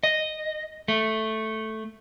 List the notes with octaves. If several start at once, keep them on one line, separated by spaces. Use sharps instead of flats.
D#5
A3